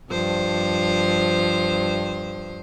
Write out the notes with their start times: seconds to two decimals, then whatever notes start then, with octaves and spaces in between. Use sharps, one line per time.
0.11 G2 F3 C5